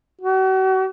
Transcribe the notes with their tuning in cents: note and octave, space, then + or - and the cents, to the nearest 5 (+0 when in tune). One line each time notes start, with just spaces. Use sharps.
F#4 +40